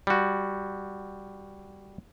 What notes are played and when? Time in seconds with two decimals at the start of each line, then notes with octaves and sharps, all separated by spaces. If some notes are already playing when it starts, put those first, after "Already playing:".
0.07 G3 F#4